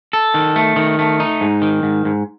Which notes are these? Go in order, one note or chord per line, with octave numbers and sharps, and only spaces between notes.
A4
D#3
A3
D#3
A3
D#4
G#2
D#3
G#2
G#2